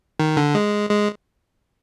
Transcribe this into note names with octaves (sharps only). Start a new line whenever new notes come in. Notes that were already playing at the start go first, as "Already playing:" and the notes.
D#3
D3
G#3
G#3